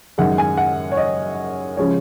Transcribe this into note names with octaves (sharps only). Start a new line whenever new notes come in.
F#2 D#3 G#3 F#5
G#5
F#5
C#5
D#5
C#3 F3 G#3 C#4 C#5